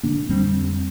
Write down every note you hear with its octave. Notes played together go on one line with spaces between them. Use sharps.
D3 A#3 D4
F2 G3 C4